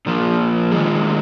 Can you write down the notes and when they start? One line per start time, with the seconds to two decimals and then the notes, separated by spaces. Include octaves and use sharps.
0.06 A#2 F3 A#3
0.71 D#3 G#3 F4 G#4